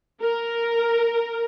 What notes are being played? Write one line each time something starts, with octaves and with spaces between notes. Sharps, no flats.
A#4